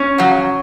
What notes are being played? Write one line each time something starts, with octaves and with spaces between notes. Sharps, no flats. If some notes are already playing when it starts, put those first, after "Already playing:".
Already playing: C#4
C#3 F#3